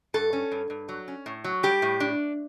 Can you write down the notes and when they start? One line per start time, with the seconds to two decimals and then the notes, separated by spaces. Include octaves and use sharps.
0.14 G2 A4
0.33 C#4
0.52 G2
0.70 G2
0.89 F#3
1.08 C#4
1.26 A2
1.44 F#3
1.63 G3 G4
1.82 A2
2.00 D4